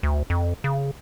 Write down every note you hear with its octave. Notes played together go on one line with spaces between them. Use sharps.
D2
F2
C#3